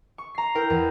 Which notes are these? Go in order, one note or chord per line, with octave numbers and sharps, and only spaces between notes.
C#6
A#5 C7
E4 A#4 G5 A#6
E2